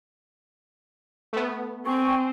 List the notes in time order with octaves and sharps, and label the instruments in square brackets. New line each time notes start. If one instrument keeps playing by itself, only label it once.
[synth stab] A3 B3
[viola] C4 [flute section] G5 G#5 C#6